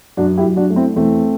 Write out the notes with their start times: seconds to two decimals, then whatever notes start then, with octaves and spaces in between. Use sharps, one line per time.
0.17 F#2 D4 F#4
0.38 E4 G4
0.44 F#2
0.57 D4 F#4
0.70 A3
0.76 C4 E4
0.96 E2 A3 C4